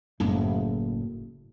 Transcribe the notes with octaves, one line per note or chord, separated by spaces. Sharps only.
F#1 A2